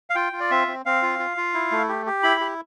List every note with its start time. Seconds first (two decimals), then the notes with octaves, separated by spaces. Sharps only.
0.10 F5
0.15 F4 G5
0.33 F4
0.40 D5
0.51 C4 E5
0.68 C4
0.86 C4 F5
1.02 F4
1.19 F4
1.37 F4
1.54 E4
1.71 A3
1.89 G4
2.06 G4
2.23 E4 B5
2.41 G4